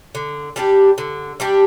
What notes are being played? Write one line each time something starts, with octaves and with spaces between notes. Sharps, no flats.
D3
G3 D4 G4
D3
G3 D4 G4